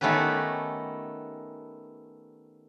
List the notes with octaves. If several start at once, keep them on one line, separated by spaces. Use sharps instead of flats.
D#3 A3 B3 C#4 G4 B4